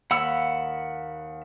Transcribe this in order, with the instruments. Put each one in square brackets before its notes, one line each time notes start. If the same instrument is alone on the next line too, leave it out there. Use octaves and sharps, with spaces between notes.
[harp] D#2 [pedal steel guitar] F#5 B5 E6